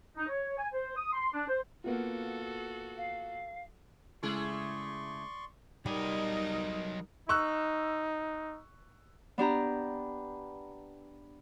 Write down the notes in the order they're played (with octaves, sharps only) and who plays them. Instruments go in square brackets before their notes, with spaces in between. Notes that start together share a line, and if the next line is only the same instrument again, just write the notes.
[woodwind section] D#4
C#5
G#5
C5
D#6
C6
D4
C5
[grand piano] A#3 B3 F4 [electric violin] F#4 A4
[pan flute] F5
[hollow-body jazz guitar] C#3 G#3 [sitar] A3 E4 G#4 [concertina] D5 C6 C#6
[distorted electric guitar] F#3 D#5 [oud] G3 [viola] D#4 A#4
[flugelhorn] D#4 [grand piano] C#6 E6 F#6
[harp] B3 D4 G4 A#5